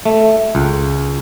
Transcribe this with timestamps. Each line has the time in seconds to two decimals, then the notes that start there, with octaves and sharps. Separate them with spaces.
0.05 A3
0.55 C#2